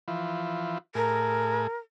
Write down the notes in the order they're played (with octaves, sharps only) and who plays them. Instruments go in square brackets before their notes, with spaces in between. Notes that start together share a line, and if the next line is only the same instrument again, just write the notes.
[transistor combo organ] E3 F3
[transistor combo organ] A2 G#4 [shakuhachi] A#4